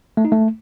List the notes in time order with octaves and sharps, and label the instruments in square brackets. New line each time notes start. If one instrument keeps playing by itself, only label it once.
[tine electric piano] A3
D#4
A3